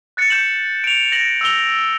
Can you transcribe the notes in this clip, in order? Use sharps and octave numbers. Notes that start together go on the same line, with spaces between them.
F#6 A6 C#7
G6 E7 F#7
D7 F7
A#6 F#7
E6 F7 G7